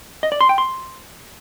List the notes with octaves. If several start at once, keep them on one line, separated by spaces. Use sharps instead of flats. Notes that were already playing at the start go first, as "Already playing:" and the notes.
D#5
D5
C6
G5
C6